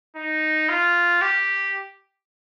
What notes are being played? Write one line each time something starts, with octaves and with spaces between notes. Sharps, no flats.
D#4
F4
G4